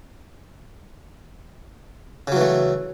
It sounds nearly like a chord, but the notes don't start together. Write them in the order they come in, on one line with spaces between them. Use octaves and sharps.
C#3 F#3 E3 A3